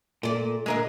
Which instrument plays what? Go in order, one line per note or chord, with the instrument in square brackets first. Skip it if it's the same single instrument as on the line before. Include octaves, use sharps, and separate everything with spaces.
[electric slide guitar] A#2 [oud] A4 D5
[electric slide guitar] A#2 D3 G#3 [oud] G#4 A#4 D#5